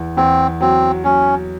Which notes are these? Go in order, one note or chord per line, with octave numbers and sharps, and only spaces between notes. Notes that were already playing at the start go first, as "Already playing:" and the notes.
Already playing: E2
E2 C4
F#3 C4
F#3 C#4